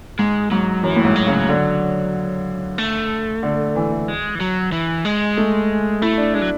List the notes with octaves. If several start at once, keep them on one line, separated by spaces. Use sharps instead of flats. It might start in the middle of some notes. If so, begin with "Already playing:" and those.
G#2 G#3
G#2 F#3
F#2 E3
A2
G#2
F#3
C#3
D3
A3
D3
E3
G#3
E3
F#3
E3
G#3
A3
A3 E4
D4
G#3 D4
F#3